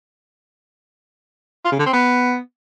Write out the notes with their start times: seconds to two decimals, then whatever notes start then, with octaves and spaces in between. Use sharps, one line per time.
1.65 F4
1.72 C#3
1.79 D3
1.86 C4
1.93 B3